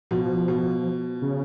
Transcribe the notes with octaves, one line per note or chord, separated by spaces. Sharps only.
B2 F3
B2
C#3